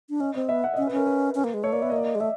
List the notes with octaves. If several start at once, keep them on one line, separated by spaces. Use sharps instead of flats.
D4
C#4 D#5
C4 D#5
B3 E5
F#5
D#5
C#4 E5
B4
C#4 A#4
B4
C#4
A#3
G#3
A3 C#5
A#3 D5
B3 E5
A#3 D#5
D5
D#5
G#3
A3 E5